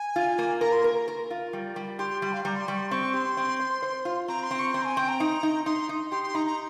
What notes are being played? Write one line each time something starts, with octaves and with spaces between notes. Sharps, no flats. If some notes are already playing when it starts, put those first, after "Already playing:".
Already playing: G#5
F4
A#3
A#4 A#5
C6
A#4
A#4
F4
G3
G3
G4 C6
C6
G3 C6
F5
G3 A#5
C6
G3 C#6
C6
C4 C#6
G4 C6
C4
C5
C5
F4
C4 A#5
C6
C4
C#6
C4 C6
A#5
G#5
C4 G5
A#5
D#4
D#4
D#4 C6
D#4
G4 C6
C6
D#4 A#5
A#5